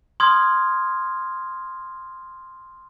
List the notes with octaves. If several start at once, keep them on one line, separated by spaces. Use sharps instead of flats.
C6 D#6 F6 G#6